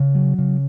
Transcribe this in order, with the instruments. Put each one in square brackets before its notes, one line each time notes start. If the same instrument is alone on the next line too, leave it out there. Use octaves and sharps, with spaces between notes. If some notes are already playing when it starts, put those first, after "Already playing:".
Already playing: [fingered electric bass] C#3
F#3
C#3